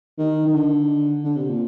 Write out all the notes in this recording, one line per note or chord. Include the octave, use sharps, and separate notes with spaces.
D#3
D#3
D3
D3
C3
A#2